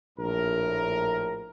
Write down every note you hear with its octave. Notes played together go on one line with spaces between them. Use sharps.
A#1 A2 A#4